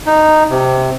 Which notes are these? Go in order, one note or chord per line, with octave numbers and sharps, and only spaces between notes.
D#4
C3